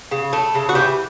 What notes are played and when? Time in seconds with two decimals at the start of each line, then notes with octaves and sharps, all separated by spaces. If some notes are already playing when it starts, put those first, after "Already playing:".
0.11 C#3
0.33 A3
0.55 C#3
0.69 F#4
0.75 E3 G4